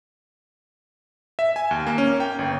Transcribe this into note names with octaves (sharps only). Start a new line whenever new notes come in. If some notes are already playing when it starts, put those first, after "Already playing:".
E5
G#5
D#2
A#3
C#4
G5
G1